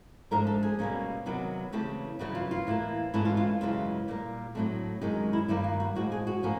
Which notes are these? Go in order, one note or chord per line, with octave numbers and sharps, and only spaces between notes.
G#2 F3 A3 D4 A#4
A4
G#4
B2 G3 A#3 C#4
C3 D#3 F#3 B3
C#3 E3 A3 C4 G4
F#2 C#3 E3 G3 F#4
F4
F4
A2 E3 G3 A#3
G#2 E3 A3 C#4 E4
F4
F4
F#2 C#3 E3 G#3 F4
A#2 G3 A#3
A2 F#3 A3 C4
F#2 D#3 G#3 C#4 G4
E4
G2 D#3 G3 A#3 E4
F4
F#4
A2 F3 G#3 F#4
G#4
F#4
A2 F3 A#3 C#4